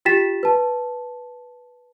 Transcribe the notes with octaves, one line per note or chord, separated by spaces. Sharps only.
F4 G4 G5 A6 B6 E7
B4 A5